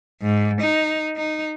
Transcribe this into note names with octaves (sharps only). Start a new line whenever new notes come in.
G#2
D#4
D#4